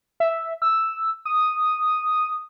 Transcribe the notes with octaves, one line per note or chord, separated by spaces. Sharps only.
E5
E6
D#6